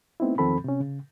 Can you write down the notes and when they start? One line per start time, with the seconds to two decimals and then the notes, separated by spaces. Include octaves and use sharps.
0.20 A3 B3 C4 D#4 E4
0.38 E2 D#3 F3 C4 A4 B5
0.64 C3 C#4
0.80 C#3